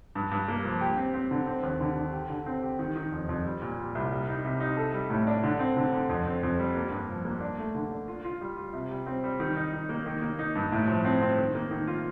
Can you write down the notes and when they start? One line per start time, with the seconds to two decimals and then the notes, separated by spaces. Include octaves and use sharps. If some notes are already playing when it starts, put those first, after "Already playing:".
0.15 G2
0.31 G2
0.48 A#3
0.64 F3
0.81 G4
0.97 C4
1.14 C4
1.31 D3
1.47 C4
1.63 D#2
1.81 D3
1.96 D3
2.12 G4
2.30 D3
2.46 C4
2.62 G4
2.79 D#3
2.96 D#3
3.12 F2
3.29 F2
3.45 G3
3.62 A#2
3.78 G3
3.95 C2
4.12 G3
4.28 D#4
4.44 C3
4.60 D#4
4.77 A4
4.93 G3
5.10 A2
5.27 D4
5.43 D3
5.59 C4
5.77 D3
5.92 D3
6.09 F2
6.26 C4
6.43 F2
6.58 G3
6.75 A#3
6.91 G2
7.09 F3
7.25 A#3
7.41 D4
7.58 A3
7.75 D3
7.91 D4
8.08 F4
8.25 F4
8.41 G3
8.57 F4
8.73 C3
8.90 G3
9.06 C4
9.24 G3
9.40 D#3
9.56 D#4
9.73 D#4
9.89 A#3
10.06 D#3
10.22 A#3
10.39 D#4
10.55 G2
10.72 A2
10.88 F3
11.04 C4
11.21 C4
11.38 D#3
11.55 A#3
11.71 D#3
11.88 F4